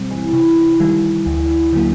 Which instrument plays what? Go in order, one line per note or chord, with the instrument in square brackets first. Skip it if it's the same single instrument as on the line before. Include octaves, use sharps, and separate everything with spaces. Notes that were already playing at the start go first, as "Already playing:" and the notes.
Already playing: [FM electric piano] B2 G3 C4
[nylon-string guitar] E3
[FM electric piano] C3
D#3 G3
[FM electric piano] D2 [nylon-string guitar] E3
[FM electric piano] D3 F#3 A#3 [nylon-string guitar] E3